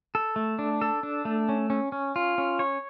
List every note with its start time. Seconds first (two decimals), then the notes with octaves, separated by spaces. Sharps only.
0.15 A4
0.36 A3
0.59 D4
0.81 A4
1.03 D4
1.25 A3
1.49 C#4
1.70 C#4
1.92 C#4
2.16 F4
2.38 C#4
2.59 C#5